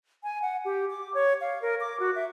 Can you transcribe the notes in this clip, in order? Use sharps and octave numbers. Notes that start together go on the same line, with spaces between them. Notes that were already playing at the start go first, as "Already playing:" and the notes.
G#5
F#5
G4
D6
C#5
F5
A#4
D6
F#4
E5